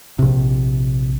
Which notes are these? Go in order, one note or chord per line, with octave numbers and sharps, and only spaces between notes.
A#1 C3